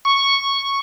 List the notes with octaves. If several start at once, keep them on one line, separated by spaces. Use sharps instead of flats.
C#6